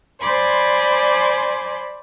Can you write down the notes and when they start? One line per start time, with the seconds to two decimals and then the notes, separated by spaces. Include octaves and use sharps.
0.21 C5 D5 G#5 B5 C6 D6